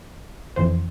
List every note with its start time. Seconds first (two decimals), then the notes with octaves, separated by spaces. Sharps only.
0.56 F2 E3 C5